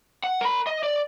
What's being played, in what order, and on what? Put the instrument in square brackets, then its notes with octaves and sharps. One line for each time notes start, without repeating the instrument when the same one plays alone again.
[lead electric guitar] F#5
A#4 B5
D#5
D5